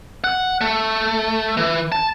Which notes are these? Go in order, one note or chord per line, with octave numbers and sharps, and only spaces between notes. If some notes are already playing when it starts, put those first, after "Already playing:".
F#5
A3
E3
A5